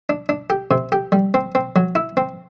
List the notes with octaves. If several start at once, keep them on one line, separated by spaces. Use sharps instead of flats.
D4
D4
G4
C3
G4
G3
C4
C4
F#3
E4
C4